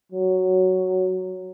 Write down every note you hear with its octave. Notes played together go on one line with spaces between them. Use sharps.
F#3